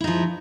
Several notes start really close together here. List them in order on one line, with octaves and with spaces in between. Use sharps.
E4 D#4 F3